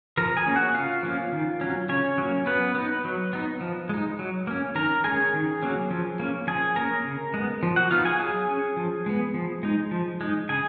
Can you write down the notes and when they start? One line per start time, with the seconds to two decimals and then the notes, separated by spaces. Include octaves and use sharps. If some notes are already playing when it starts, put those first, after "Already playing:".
0.17 F3 A#4 A#5
0.37 G#4 G#5
0.47 A#3 C#4
0.56 F#4 F#5
0.75 C#3 F4 F5
1.03 F3 A#3 C#4
1.33 D#3
1.61 F#3 C#4
1.89 C#3 C#4 C#5
2.18 F#3 A#3
2.46 F#3 B3 B4
2.75 B3 D#4
3.05 F#3
3.33 B3 D#4
3.61 F3
3.89 G#3 D#4
4.19 F#3
4.47 A#3 C#4
4.75 D#3 A#4 A#5
5.04 G#3 C#4 G#4 G#5
5.34 D#3
5.63 F#3 A#3 C#4
5.90 F3
6.20 A#3 C#4
6.47 F3 G#4 G#5
6.76 A#3 C#4 A#4 A#5
7.05 C#3
7.34 G#3 B3
7.63 F3
7.76 F#4 F#5
7.91 B3 D#4 F4 F5
8.05 G#4 G#5
8.20 F#3 G#4 G#5
8.48 C#4
8.77 F3
9.06 G#3 B3
9.34 F3
9.63 G#3 D#4
9.91 F3
10.21 G#3 D#4
10.49 C#3 G#4 G#5